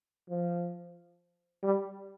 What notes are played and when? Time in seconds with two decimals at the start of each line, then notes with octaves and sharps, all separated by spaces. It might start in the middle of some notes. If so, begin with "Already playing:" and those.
0.29 F3
1.63 G3